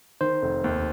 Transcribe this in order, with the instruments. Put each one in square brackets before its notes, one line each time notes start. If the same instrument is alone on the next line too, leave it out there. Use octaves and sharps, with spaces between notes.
[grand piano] D#3 [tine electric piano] C5
[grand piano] F1
D#2